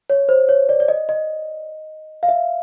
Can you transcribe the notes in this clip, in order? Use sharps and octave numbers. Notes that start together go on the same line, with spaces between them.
C#5
C5
C#5
D5
D5
D#5
D#5
F5
E5